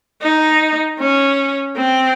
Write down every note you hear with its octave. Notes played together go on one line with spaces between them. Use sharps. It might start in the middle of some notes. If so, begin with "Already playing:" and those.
D#4
C#4
C4